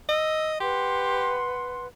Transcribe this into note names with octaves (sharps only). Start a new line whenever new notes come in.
D#5 E6
G4 B4 F#5 C6